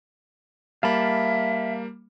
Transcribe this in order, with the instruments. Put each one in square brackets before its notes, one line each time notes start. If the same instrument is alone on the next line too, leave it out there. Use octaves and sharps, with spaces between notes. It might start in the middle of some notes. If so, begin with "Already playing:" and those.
[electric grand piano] G3 A#3 [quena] E5 [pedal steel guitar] F5 A5 B5